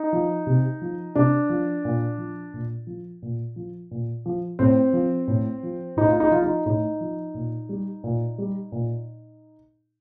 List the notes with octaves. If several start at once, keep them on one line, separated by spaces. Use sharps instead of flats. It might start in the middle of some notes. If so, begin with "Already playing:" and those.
Already playing: D#4
F3
C3
F3
C3 D4
F3
A#2
F3
A#2
F3
A#2
F3
A#2
F3
A2 C4
F3
A2
F3
A2 D#4
F4
D#4
F3 F4
D#4
A2 D#4
F3
A#2
G3
A#2
G3
A#2